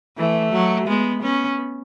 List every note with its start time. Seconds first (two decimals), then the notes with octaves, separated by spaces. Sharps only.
0.17 E3 A3
0.53 F#3
0.87 G#3 B3
1.23 B3 C#4